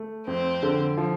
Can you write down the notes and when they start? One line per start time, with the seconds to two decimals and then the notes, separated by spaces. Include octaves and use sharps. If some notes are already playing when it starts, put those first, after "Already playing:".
Already playing: A3
0.27 F2 C4
0.63 D3
0.98 F3